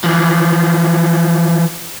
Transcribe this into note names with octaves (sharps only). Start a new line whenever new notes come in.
E3 F3